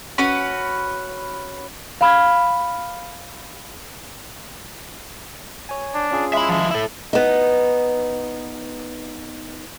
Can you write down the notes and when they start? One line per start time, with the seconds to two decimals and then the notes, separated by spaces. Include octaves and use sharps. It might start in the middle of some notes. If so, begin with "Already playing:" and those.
0.18 C#4 F#4 B4
2.01 F5 B5 F6 G#6
5.69 C#5 G#5
5.94 D4
6.11 C#4 F4 G#4
6.33 G#3 E5 B5
6.49 F3 E4
6.71 E4 A4
7.13 B3 D#4